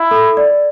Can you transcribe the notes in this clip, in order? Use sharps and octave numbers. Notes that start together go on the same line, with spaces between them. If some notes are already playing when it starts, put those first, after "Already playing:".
Already playing: E4
A4
D5